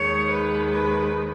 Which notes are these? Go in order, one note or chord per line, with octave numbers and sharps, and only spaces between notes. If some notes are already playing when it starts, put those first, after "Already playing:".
Already playing: D#2 D#3 G#3 C#5
B4
B4